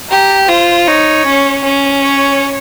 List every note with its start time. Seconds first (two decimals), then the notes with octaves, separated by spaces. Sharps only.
0.11 G4 A#5
0.48 F4 C5
0.87 D#4 C#5
1.26 C#4
1.64 C#4
2.03 C#5